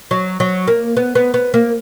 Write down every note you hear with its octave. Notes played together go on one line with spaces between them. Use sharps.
F#3
F#3
A#3
B3
B3
B3
A#3